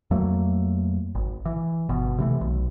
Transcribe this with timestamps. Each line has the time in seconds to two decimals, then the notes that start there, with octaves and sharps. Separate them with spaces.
0.11 F2 F#3 A3 A#3
1.15 G#1
1.45 E3
1.89 G1 B2
2.18 C3 E3 A3
2.41 B1